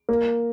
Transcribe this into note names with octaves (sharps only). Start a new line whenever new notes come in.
A#3